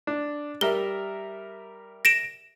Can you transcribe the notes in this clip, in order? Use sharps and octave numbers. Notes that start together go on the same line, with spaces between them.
D4
G3 A#4 E5 G7
A#6 D7 E7